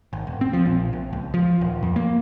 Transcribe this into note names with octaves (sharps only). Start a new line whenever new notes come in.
G#1
E1
C4
F3
A#1
A#1
C#2
F3
D#1
F2
A#3